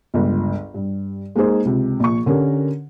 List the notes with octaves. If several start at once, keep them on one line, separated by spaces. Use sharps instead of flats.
G1 C#2
G2
G#3 A#3 D#4 G#4 C5
C#2 C3
A#1 C#6
D3 C#4 G4 A#4